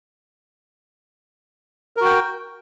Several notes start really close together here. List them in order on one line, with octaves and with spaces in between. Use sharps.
A#4 F#4 G5